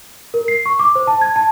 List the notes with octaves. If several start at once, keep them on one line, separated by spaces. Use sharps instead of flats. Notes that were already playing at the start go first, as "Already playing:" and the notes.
A#4
C7
C#6
D6
C5
A5
G#6
A5